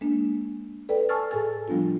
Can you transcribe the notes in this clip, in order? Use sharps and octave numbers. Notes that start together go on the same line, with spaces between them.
G#3 A#3 D4
A4 B4 D5 G5
G#5 A5 C#6 E6 F6 A6
A2 G#4 A4 G#5 A6
F3 G3 B3 D4 F4